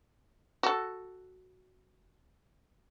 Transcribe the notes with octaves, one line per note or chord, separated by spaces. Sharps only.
F#4 A4